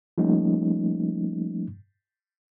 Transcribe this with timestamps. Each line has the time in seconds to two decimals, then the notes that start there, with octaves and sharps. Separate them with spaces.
0.18 F3 G3 A3 A#3 C#4 D#4